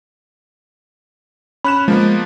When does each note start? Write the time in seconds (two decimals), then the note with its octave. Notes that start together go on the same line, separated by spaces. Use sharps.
1.64 C#4 B5 F#6 E7
1.88 F3 G#3 A#3 B3